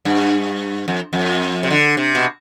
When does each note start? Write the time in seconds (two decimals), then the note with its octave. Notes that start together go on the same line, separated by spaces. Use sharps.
0.05 G2
0.88 F2
1.13 F2
1.63 C3
1.70 D3
1.97 C3
2.15 B2